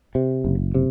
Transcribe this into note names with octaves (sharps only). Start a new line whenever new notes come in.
C3
F#1
C3